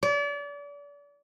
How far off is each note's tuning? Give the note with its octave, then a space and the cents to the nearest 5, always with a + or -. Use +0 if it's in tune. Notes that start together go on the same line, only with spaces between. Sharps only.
D5 -35